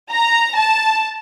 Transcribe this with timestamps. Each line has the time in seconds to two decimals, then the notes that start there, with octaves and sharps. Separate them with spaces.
0.10 A#5
0.56 A5